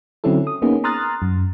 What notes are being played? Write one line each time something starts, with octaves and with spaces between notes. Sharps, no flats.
D3 F#3 C4 C#4 E4 A4
D#6
A#3 B3 C#4 D#4 G#4
A#5 C6 D#6 F6 F#6 A6
F#2